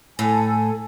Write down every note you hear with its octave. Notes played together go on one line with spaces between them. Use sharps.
A2 A4 G#5